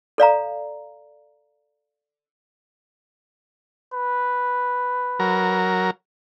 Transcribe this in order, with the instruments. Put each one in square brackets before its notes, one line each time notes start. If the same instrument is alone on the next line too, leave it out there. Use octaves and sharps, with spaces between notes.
[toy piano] A4 D5 F5 A#5
[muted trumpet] B4
[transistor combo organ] F#3 A#4